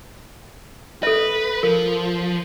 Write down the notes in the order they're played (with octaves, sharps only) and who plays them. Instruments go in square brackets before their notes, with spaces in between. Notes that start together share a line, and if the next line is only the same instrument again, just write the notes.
[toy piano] A4 E5 [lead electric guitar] B4
[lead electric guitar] F3 [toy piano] A#4